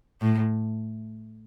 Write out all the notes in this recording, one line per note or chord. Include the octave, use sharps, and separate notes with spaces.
A2